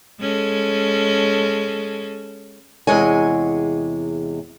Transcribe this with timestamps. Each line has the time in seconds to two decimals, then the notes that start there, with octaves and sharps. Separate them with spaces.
0.20 G#3 C#4 A4
2.87 E2 C3 G#3 C#5 G#5